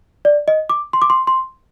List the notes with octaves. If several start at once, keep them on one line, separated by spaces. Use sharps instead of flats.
D5
D#5
D6
C6
D6
C6
C6